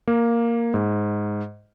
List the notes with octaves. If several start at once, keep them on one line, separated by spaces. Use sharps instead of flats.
A#3
G#2